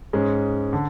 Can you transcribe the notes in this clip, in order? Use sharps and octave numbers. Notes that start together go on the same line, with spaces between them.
G#2 G#3 C#4
D3